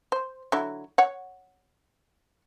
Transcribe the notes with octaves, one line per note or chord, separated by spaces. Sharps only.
C5
D3 F#3 E4
C#5 F#5